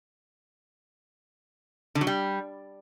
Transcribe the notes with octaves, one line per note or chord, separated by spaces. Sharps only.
D3
F#3
G3